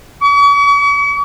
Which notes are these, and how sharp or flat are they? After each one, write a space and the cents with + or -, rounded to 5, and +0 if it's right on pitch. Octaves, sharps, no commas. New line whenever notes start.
C#6 +45